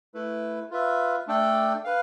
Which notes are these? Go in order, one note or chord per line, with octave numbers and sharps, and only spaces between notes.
A3 E4 B4
F4 B4 E5
A3 D4 A4 D5 G5
B4 F5